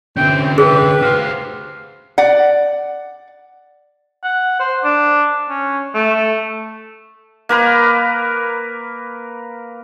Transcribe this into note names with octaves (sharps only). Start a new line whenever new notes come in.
B2 D3 E3 C4 C#4 G5
G4 G#4 B4 E5
F#4 C5 F5
D5 F#5
F#5
C5
D4
C#4
A3
A#3 A#4 B4